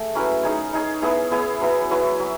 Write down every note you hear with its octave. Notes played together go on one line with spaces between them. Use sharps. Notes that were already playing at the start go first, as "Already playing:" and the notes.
Already playing: A3 G#4
F#3 C#4 E4 B4
D#4 G#4 C#5
D#4 G#4 C#5
B3 E4 G#4 C#5
B3 E4 G#4 C#5
F#3 B3 E4
F#3 B3 E4
F#3